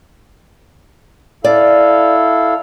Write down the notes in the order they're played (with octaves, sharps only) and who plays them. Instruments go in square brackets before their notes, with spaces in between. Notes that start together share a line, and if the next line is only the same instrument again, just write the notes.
[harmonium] E4 A4 F5 [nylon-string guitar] D5